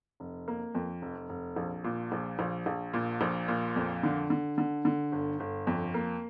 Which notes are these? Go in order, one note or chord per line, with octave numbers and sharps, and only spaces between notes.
F1
A#3
F2
F1
F1
A#1
A#2
A#1
A#1
A#1
A#2
A#1
A#2
F2
D3
D3
D3
D3
G1
G1
F2
A#3